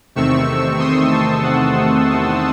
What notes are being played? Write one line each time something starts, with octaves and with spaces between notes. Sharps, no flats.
E2 C3 D#3 A3 C4 C#6 E6
C6 D#6
A5 C#6
F#5 A5
F#5 A5
A5 C#6